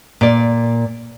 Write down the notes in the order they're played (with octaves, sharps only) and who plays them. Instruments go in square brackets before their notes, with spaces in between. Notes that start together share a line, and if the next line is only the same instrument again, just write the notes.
[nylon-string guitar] A#2 D5